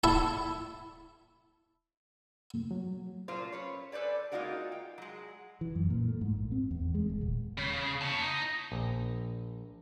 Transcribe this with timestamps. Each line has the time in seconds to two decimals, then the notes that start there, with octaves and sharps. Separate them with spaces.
0.04 E4 E5 A5
2.71 F#3
3.28 A#2 A3 F4 A#4 C5
3.52 C#4 B4 C#5
3.92 A4 B4 C5 D5 G#5
4.32 G#3 A#3 D#4 F4 F#4 A#4
4.72 G5
4.98 F#3 G#3
5.61 E3
5.75 F#2
5.90 A#2
6.08 A3
6.21 G#2
6.35 A#1
6.52 C4
6.71 E2
6.95 G#3
7.10 F1
7.21 D#1
7.58 C#3
8.01 C#5 A5
8.22 D#4
8.72 A#1